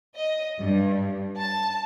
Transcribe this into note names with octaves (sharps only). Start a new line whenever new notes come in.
D#5
G2
A5